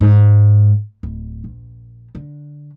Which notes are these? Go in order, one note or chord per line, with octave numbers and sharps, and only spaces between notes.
G#2
D1
A#1
D3